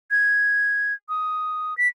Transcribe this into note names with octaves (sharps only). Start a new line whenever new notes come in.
G#6
D#6
B6